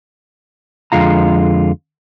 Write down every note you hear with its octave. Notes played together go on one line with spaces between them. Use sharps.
F2 D3 G#3 F4 A#5